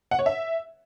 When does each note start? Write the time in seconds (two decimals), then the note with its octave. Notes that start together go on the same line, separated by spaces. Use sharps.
0.11 F#5
0.19 C#5
0.26 E5